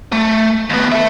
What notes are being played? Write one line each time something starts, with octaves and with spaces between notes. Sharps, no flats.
A3
D#2 B3
A4 E5